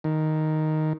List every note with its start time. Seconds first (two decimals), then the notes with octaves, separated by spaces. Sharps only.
0.04 D#3